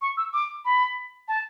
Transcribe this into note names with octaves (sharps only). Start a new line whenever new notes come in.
C#6
E6
D6
B5
A5